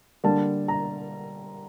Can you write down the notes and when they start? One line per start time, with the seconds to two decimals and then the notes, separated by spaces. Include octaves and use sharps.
0.24 D3 G3 A#3 A5
0.68 A#5